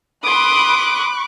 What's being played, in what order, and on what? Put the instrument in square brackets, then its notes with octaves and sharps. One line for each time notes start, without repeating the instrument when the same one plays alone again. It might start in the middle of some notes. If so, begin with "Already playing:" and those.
[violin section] B5 D6 F#6 [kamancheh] C6 D#6